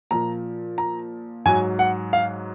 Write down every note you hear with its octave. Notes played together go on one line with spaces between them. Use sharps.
A#2 F3 A#5
A#5
G#2 F#3 G#5
F#5
F5